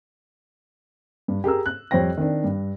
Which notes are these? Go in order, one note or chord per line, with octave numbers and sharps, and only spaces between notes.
G2
G4 G#4 A#4 A#5 E6
F#6
F2 G3 C5 C#5 G5 A#6
D#3 C4 D4
G2